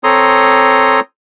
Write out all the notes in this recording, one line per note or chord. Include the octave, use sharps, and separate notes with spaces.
C4 A4 C#5 A#5 C6 D#6